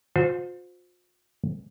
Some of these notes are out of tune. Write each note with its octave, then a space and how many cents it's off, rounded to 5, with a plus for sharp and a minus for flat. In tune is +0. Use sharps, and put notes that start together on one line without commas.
F4 +45 C5 -10